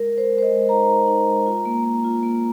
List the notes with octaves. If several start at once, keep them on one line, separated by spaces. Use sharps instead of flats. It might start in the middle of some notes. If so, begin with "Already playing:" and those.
Already playing: G#3 A#4
G#3
C5
G#3
C5
D#5
G#3
D#4 A#5
D#4
D#4
G#3
F4
A#3
A#3
F4
A#3